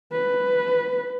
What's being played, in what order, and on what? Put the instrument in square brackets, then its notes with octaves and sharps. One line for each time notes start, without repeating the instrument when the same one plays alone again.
[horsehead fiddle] B4